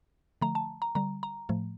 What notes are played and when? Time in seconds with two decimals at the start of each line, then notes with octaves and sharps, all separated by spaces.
0.42 D3 F3 A3 A#5
0.55 A5
0.82 A#5
0.95 D3 G3 A#5
1.23 A#5
1.49 A2 F3 A3